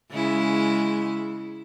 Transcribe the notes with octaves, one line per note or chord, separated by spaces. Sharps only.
C#3 G#3 E4